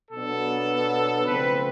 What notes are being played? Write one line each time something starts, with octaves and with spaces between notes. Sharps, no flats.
B2 F#3 B3 D4 A4
C#3 F3 A3 C4 B4